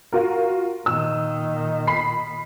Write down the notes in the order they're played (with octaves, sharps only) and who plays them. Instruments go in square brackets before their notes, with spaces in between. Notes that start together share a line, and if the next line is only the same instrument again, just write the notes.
[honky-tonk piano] F4 F#4 A#4
[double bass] A#2 D#3 [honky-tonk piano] E6
[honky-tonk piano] B5 C7